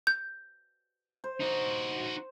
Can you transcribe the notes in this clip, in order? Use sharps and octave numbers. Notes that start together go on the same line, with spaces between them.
G6
C5
D#4 F#4